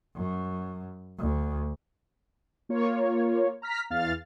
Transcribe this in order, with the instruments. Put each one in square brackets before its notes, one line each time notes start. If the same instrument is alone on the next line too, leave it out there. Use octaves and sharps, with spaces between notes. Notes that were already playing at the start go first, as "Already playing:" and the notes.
[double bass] F#2
D2
[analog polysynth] A#3 F4 C#5
A#5 F6 B6
E2 F5 F6 A6